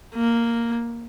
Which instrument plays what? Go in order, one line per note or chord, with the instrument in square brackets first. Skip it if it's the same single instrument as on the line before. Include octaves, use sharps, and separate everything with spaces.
[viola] A#3